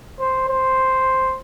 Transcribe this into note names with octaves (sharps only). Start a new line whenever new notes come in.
C5
C5